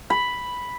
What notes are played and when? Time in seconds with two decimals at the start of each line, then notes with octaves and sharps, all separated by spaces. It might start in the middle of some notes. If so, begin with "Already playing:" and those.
0.10 B5